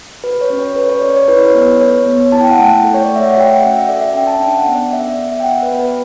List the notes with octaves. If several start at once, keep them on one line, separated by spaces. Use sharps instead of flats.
F#4 B4
C#5
C#4
C#5
A4 B4
C#5
C#4 D5
C#5
E4 B4
C#5
B3
B4
A4 C#5
B3
E4 A5
G5
F#5
A3 G5
A4
C#5
D5
A3
E5
F#5
F#4 G5
G5
F#5
C#4
E5
A4 D5
E5
C#4 G5
A5
D4 G5
F#5
B3
D5
A4 E5
D5
B3
E5
G5
F#4 F#5
B4
B3
B4